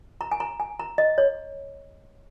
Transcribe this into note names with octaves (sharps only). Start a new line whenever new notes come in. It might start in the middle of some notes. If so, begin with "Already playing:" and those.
A#5
G#5
A#5
G#5
A#5
D#5
C#5